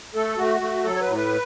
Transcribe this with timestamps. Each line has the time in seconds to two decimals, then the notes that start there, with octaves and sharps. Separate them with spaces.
0.15 A3 A4
0.38 A3 F#4
0.61 A3
0.84 F#3 A4
0.95 C#5
1.01 B4
1.07 A2
1.16 B4